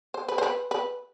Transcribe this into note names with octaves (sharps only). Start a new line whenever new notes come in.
C5
B4
C5
B4
B4